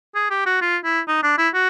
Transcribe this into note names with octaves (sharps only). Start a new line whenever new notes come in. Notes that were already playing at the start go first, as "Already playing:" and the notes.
G#4
G4
F#4
F4
E4
D#4
D4
E4
F#4